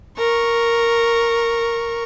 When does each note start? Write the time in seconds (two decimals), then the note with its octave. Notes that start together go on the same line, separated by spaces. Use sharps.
0.18 A#4 C#6